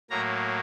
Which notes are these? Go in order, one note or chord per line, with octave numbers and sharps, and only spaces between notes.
A2 F#3 A#3 A#5